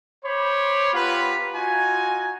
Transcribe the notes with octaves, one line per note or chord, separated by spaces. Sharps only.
C5 C#5 B5 C6 D6
B3 F4 G4 B4 A#5 B5
D#4 F4 F#4 G#5